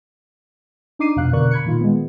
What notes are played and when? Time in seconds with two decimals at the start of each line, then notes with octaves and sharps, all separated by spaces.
0.99 D4 D#4 D6 C7 D#7
1.16 F2 B2 F5 F#6
1.33 B2 D3 A#4 D5 C#6 F#6
1.51 B5 G#6 C#7
1.65 A#2 D#3 F4
1.80 G#3 B3